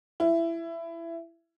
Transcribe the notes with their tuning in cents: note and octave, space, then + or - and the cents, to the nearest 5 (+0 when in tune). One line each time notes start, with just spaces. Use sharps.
E4 +20